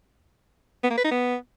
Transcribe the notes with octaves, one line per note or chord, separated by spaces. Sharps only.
B3
A#3
B4
D#4
B3